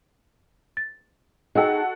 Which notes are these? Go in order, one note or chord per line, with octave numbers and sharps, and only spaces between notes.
A6
D#4 F#4 G#4 A4 D#5 F#5 G5 E6